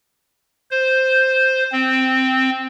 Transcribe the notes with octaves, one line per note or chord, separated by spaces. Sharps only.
C5
C4